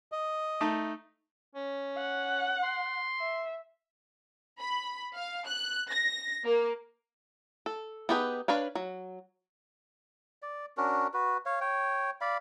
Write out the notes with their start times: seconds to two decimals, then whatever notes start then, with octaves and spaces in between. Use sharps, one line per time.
0.12 D#5
0.61 A3 D#4 A5
1.55 C#4
1.97 F#5
2.63 C6
3.20 E5
4.60 B5
5.16 F5
5.47 F#6
5.91 A#6
6.44 A#3
7.66 A4
8.09 B3 D#4 G4 G#4 B4
8.48 D4 B4 C#5 F5
8.75 F#3
10.42 D5
10.77 C#4 D4 F#4 A#4
11.14 F#4 B4
11.46 C#5 F5
11.61 C#5 G5
12.21 D5 F5 B5